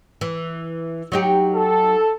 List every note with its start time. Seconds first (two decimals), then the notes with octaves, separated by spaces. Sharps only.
0.21 E3
1.12 F#3 D#4 G4
1.55 A4